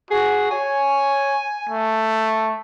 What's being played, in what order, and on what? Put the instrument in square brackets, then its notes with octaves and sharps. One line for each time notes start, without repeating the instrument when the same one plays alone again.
[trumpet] F#4 [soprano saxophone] G#4
[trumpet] C#5 [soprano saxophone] G#5
[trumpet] A3